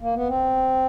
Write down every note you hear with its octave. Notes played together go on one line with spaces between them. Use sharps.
A#3
B3
C4